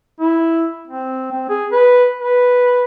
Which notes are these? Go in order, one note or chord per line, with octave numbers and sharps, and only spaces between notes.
E4
C4
C4
G#4
B4
B4